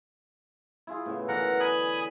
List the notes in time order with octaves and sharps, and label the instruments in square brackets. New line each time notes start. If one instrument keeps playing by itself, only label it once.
[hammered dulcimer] E4 F4 G#4
A2 C#3 B3
[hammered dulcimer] B2 D3 E3 [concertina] A#4 F#5
[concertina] G#5 B5 D#6